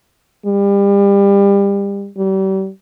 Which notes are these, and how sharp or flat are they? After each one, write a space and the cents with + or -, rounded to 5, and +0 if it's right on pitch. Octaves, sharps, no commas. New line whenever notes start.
G3 +30
G3 -35